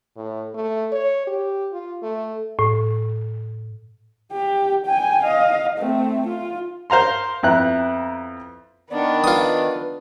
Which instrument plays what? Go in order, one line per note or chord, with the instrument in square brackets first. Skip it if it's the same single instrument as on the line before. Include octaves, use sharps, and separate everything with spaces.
[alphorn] A2
A3
C#5
G4
F4
A3
[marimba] A2
[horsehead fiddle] G4
G5 G#5
D#5 F5
A3 C4
F4
[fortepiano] A#4 C5 F5 A#5 C6
F2 B3 E4 G5 A#5 F#6
[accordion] D#3 [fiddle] B3 D4 [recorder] D5
[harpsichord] F4 D#6 [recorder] B4